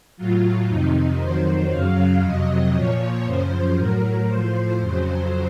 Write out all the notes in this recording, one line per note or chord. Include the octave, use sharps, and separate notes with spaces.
A2 F#3 F4
F2 C3 D#3 D#4
F2 D#3 F#3 C5
F#2 C#3 F#3 F5
F2 C3 F#3 D#5
A#2 F3 C#5
F#2 C#3 F3 C5
A2 F#3 A#4
A2 F3 C5
F2 C#3 F#3 C5